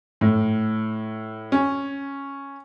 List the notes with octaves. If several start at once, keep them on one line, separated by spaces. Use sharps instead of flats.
A2
C#4